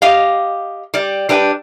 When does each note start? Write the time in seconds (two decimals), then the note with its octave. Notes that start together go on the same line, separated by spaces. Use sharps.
0.02 G4 D#5 F5
0.94 G3 D5
1.29 G3 D4 B4 G5